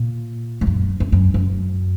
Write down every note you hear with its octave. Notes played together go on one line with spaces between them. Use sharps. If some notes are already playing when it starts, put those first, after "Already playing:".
Already playing: A#2
G#2
F#2
F2
F#2
F#2